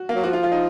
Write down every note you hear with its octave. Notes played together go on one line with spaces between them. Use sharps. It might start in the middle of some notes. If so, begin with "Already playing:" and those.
Already playing: F#4
A#3
F#3
F3 F#4
F4
F4
D#4